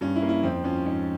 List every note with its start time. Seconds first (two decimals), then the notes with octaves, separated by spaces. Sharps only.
0.01 G2 C#4
0.16 E4
0.22 A#3
0.29 E4
0.43 F2 C4
0.64 F3 C#4
0.85 G#2 C#4